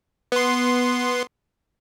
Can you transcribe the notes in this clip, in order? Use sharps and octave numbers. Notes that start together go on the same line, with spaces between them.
B3 C6